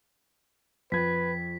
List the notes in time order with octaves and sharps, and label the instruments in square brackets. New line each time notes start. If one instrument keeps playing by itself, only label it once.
[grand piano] F2 G#6 [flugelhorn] B4 [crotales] B6